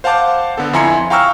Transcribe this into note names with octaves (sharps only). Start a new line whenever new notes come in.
C5 F5 F#5 A5 D6 G6
D3 B3 A4
F2 E4 G#5 A#5 C6 C#7
F5 G5 A#5 C#6 E6 F6